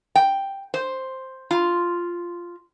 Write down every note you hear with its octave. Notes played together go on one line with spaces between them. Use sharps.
G5
C5
F4